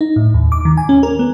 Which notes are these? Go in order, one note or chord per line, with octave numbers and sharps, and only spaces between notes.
D#4
A2
D#2
D6
D#3
G#5
C#4
A#4
B3